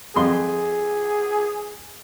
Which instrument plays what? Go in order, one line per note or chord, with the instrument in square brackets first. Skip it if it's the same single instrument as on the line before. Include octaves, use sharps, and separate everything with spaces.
[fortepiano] F2 C6 [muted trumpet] G#4